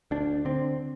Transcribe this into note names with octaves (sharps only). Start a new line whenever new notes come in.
D2 D4
D3 C4